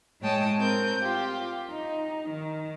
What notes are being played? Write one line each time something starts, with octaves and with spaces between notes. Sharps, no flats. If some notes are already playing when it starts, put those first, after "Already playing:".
A2 G#3 C#5 G5 A5 D#6
C4 A#4 G6
F4 G4
D#4
D#3